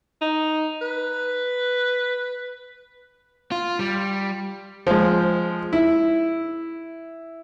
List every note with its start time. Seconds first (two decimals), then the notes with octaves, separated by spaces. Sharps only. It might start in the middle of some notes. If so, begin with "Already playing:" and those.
0.22 D#4
0.82 B4
3.52 F4
3.79 G3
4.87 F3 G#3
5.73 E4